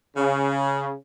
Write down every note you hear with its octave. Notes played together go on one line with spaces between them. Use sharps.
C#3